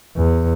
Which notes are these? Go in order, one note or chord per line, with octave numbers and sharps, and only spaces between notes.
E2